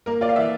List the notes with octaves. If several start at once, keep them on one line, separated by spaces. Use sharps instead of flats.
A#3 A#4
F4 D5
F5
E3 E5